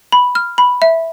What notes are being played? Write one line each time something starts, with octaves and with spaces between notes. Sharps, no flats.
B5
F6
B5
E5